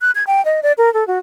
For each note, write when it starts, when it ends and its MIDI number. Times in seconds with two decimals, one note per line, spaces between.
0.01 0.11 90
0.15 0.24 92
0.27 0.44 79
0.45 0.60 75
0.63 0.72 74
0.78 0.92 70
0.94 1.06 69
1.08 1.19 66